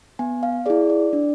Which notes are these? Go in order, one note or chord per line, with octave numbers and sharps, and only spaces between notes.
B3 G#5
F5
E4 G#4 D5
D5
D4